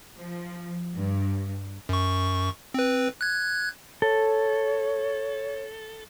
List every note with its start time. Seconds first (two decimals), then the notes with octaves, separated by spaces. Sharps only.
0.16 F3
0.95 G2
1.89 F#2 C#6
2.74 C4 B4
3.21 F#6 G#6
4.02 A4 C#5